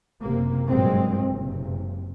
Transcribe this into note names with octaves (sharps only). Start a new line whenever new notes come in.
F#1 C3 A#3
G#1 G2 A#2 F#3 G#3 C4
F#1 C3